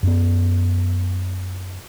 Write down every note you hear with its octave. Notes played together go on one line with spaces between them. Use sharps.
F#2 B3